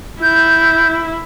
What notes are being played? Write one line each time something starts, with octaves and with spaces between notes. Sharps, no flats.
E4 G6